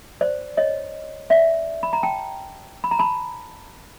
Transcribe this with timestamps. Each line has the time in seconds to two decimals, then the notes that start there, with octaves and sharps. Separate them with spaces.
0.21 C5 D5
0.57 C#5 D#5
1.30 D5 E5
1.83 B5
1.93 A#5
2.03 G5 A5
2.84 B5
2.91 A#5
2.99 A5 B5